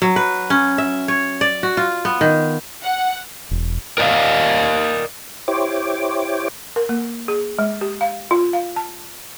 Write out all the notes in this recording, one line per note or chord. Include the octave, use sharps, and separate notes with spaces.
F#3
B4
C#4
E5
C#5
D5
F#4
F4
B3
D#3
F#5
E1
A#4 D5 D#5 F5
E4 G4 C5 C#5 D6
A#4
A#3
G#4
G#3
G4
F5
F4
F5
A5